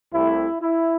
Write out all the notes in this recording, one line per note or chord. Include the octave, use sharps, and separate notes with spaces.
C2 C3 A3 E4
E4